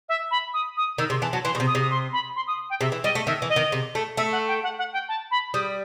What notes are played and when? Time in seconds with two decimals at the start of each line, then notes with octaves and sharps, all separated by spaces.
0.09 E5
0.31 B5
0.53 D#6
0.77 D#6
0.98 D#3 E6
1.10 C3 C6
1.21 E3 A5
1.33 F#3 A5
1.44 E3 C6
1.55 B2
1.60 C3
1.67 D#6
1.75 C3
1.81 D#6
1.90 C6
2.12 B5
2.36 C6
2.47 D#6
2.70 G5
2.81 C3 E5
2.92 E3
3.04 G3 D#5
3.15 A3
3.26 D#3 E5
3.42 E3
3.49 D#5
3.56 D#3
3.72 C3
3.95 A3
4.17 A3 E5
4.32 F#5
4.47 G5
4.63 F#5
4.78 F#5
4.93 G5
5.08 A5
5.31 B5
5.53 G3 D#6